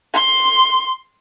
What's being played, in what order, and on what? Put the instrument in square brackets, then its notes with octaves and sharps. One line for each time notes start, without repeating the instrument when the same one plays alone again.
[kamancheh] C6